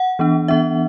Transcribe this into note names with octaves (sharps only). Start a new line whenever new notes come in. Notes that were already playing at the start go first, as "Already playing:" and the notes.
Already playing: F#5
E3 B3 D4
E3 B3 D4 E5